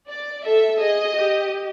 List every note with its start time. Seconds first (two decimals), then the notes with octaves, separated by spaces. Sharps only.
0.09 D5
0.45 A4 E5
0.80 G#4 D#5
1.16 G4